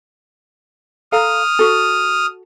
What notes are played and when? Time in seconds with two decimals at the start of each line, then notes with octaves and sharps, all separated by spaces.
1.12 A4 F5 A#5 D#6 F6
1.59 F#4 A4